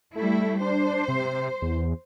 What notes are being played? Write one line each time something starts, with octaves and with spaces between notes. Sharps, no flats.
G3 A3 E4
D4 C5
C3
E2